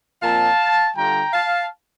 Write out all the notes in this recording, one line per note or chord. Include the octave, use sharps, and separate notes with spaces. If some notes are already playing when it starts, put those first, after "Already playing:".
A#2 F3 C4 F5 A5
D3 G3 D4 F4 G5 A#5
F5 A5